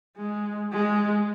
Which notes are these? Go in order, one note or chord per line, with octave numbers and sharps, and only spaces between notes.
G#3
G#3